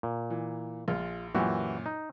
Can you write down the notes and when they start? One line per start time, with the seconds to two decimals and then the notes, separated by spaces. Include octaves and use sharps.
0.03 A#2
0.30 E3
0.88 A#1 F4
1.35 F#2 A#2 E3 F#4 G4
1.86 D#4